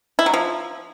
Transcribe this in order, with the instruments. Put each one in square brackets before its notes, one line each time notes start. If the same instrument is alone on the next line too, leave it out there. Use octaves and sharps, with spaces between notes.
[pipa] E4
F#3
F3